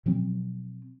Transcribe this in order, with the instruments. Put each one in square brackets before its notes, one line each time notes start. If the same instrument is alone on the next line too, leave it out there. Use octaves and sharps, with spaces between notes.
[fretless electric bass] B2 F3 F#3 C4